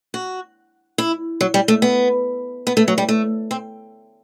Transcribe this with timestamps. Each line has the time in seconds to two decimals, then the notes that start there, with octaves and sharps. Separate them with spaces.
0.14 F#4
0.98 E4
1.41 F#3
1.54 G3
1.68 A3
1.82 B3
2.67 B3
2.77 A3
2.88 F#3
2.98 G3
3.09 A3
3.51 C4